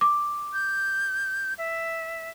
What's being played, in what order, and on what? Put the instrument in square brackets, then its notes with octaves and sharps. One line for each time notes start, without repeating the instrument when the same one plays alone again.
[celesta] D6
[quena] G6
E5